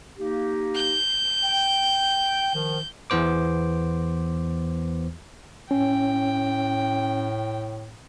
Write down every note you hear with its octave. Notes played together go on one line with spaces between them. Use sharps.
A#3 D#4 G4
G6
G5
D#3 F3
E2 E3 B3 C5 D6
A2 C#4 G5